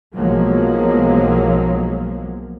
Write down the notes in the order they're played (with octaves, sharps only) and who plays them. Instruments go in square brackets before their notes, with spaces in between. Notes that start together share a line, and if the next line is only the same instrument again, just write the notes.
[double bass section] B1 F3 F#3 G#3 A#3